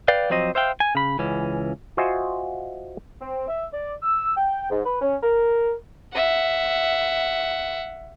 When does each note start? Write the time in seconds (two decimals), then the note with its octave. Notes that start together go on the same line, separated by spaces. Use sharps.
0.08 B4 D5 F5 G5
0.30 F3 F#3 C4 C5 D#5
0.55 C5 E5 F5 G5
0.80 G#5
0.95 C#3 B5
1.19 C#2 E3 C#4
1.97 F4 F#4 C5 D#5 E5 G#5
3.21 C4
3.48 E5
3.73 D5
4.02 E6
4.36 G5
4.70 G#2
4.85 B4
5.02 C#4
5.23 A#4
6.14 E5 F#5